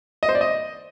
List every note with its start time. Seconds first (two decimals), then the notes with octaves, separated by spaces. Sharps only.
0.23 D#5
0.29 C5
0.35 D5
0.41 D#5